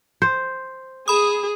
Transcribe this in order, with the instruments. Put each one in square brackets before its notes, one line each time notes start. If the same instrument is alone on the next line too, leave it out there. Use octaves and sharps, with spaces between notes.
[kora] C5
[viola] G#4 [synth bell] B5 D#6